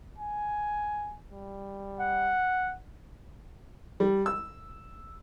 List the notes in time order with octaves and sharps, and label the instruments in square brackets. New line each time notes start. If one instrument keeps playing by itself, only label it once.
[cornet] G#5
G3
[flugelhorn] F#5
[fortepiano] G3
E6